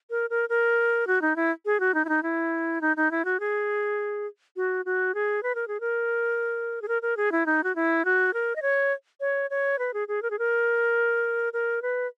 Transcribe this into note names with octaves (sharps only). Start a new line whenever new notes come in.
A#4
A#4
A#4
F#4
D#4
E4
G#4
F#4
D#4
E4
D#4
E4
D#4
D#4
E4
F#4
G#4
F#4
F#4
G#4
B4
A#4
G#4
A#4
G#4
A#4
A#4
G#4
E4
D#4
F#4
E4
F#4
A#4
D#5
C#5
C#5
C#5
B4
G#4
G#4
A#4
G#4
A#4
A#4
B4